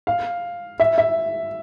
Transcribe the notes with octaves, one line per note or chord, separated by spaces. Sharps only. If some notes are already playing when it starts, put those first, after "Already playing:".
F5
E5
E5